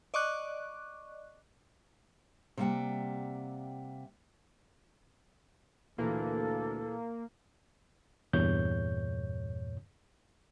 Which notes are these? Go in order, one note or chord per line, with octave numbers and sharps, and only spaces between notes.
D5 D#5 C#6 D6 F#6
C3 G3 A#3 E5 F#5 G5
D2 A#2 E3 A#3 A4
E2 G2 A#2 C#5 G6